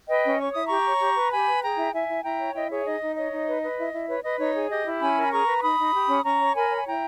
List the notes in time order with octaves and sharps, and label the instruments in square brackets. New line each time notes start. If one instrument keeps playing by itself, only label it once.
[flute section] B4 D#5 G5
C#4
C#5 C#6
E4 D#6
G4 A#5 C#6
C#5
G4
B4
G4 G#5 B5
B4
G#4 G5 A#5
E4
E4 E5 G#5
E4
E4 G5 A#5
C#5
E4 D#5 G5
G#4 C#5 E5
D#4 D#5
D#4
C#5 D#5
D#4
B4
B4
E4
E4
B4 C#5
B4 D#5
D#4 C#5
G#4
G4 D#5
E4
C#4 G#5 B5
A#4
B5
G#4 A#5 C#6
B4
C#6
D#4 B5 D#6
D#4
G4
C#4
C#4 A#5 C#6
C#5
A#4 G#5 B5
C#5
G#5
E4 G5 A#5